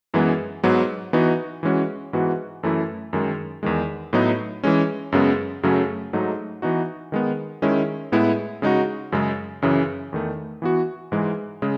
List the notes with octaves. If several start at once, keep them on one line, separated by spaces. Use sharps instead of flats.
F#2 E3 G#3 B3
G#2 F#3 B3
E3 B3 D#4 F#4
E3 G#3 C#4 F#4
G#2 E3 B3 F#4
F#2 E3 A3 E4
F#2 D#3 G#3
E2 D#3 G#3
A2 F#3 B3 D#4
E3 G#3 C#4
F#2 C#3 G#3 B3
F#2 C#3 F#3 A3 C#4
G#2 F#3 A3 D#4
E3 B3 D#4 F#4
D#3 G#3 B3
D#3 G#3 C#4 E4
A2 G#3 B3 E4
C#3 G#3 D#4 F#4
F#2 C#3 G#3
F#2 C#3 E3
E2 D#3 A3
E3 B3 F#4
G#2 E3 G#3
C#3 G#3